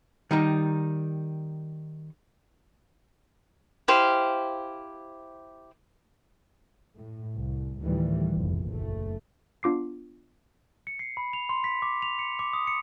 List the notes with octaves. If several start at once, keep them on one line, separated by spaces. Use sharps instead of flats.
D#3 G3 D#4
E4 G4 C5 F5
A2
C2
D2 A2 D#3 E3 G3
F1 A#1 E2
F#1 A3
B3 D4 F4 D6 C7
C#7
C7
B5
F7
C6
B6
D6
F7
C#7
D6
D#6
C#7